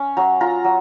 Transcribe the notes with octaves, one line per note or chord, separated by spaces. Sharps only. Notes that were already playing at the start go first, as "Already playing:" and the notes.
Already playing: C#4
F#3 A#5
F4 A#5
F#3